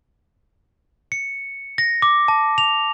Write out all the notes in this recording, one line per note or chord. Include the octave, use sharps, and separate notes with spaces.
C#7
A#6
D6
A5
F7